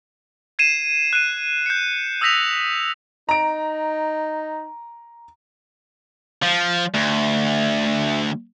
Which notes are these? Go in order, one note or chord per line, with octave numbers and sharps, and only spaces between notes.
G#6 C7 D#7 E7
F#6 D#7
G6 C#7
D#6 E6 G6 A#6 B6 F7
D#4 A#5 D7
F3
D2